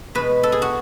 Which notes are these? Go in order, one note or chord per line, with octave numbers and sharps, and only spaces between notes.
B2 G#3 B4
A4
G#4
F#4